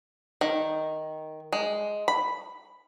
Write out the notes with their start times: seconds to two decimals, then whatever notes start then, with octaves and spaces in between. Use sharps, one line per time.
0.41 D#3
1.53 G#3
2.08 B5